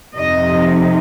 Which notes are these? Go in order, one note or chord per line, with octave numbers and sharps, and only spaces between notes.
F2 C3 F3 D#4 D#5